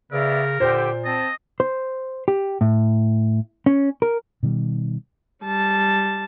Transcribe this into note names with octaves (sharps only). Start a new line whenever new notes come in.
C#3 B3 A#4 D5 E5
A#2 D3 G4 C5
C4 D#5 A5
C5
G4
A2
C#4
A#4
B2 D#3 F#3 G3
G3 A5